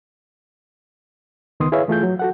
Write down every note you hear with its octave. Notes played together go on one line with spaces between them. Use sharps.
C#2 D#3 B3 C6 D#6
E4 G#4 B4 C#5 E5 F5
E3 A3 F4 G#4 G6
F#3
F#4 A4 F#5